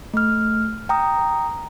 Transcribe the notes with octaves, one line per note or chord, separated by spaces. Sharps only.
A3 F6
G5 A#5 D#6